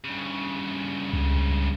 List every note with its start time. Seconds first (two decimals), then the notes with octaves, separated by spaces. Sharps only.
0.04 G2 C#3
1.13 C#2